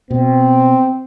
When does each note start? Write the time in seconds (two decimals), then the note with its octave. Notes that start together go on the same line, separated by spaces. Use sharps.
0.11 B2 C4